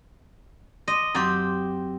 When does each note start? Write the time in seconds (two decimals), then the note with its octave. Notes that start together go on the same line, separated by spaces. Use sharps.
0.88 D#5 C6 D6
1.15 F#2 F#3 C4 G4 C6